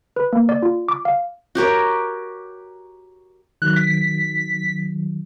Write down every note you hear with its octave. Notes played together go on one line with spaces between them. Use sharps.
B4
A#3
D5
F4
D6
F5
F#4 G4 A#4 C#5
D#3 F#3 F#6
B6